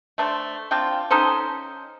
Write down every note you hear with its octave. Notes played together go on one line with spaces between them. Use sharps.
A3 D4 C5
C4 D4 F4 G5
C#4 D#4 A4 C5